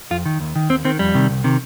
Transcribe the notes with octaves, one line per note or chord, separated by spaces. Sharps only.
F2 F4
D#3
D#2
D#3
D#2 C4
D#3 C4
F2 G3
C3 D#3
C2
C3 D#3